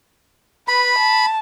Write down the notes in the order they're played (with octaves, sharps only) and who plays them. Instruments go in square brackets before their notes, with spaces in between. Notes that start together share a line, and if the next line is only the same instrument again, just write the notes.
[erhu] B4 [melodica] B5
[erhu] A5